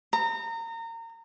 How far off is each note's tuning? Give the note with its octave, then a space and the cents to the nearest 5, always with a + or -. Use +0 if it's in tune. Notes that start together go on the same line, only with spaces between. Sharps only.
A#5 -30